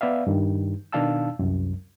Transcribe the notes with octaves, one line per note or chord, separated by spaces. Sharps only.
B3 D5 E5 F5
G2 D#3
B2 D#3 D4 F5 A5 E6
C2 F#2